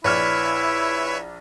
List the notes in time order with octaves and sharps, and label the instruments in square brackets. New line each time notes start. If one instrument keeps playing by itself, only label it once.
[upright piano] A#1 D5 F6 [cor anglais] E4 [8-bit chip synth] B4 C#5 E5